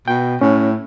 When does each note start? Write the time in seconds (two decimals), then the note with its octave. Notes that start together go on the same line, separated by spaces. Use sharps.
0.08 B2 G5
0.41 A2 C#4